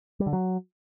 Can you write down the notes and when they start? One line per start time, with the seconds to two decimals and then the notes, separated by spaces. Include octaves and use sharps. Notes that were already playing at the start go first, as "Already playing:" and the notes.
0.20 G3
0.26 D3
0.33 F#3